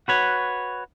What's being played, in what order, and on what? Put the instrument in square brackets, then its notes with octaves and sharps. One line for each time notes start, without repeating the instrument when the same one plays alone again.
[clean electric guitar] F#4 B4 C#5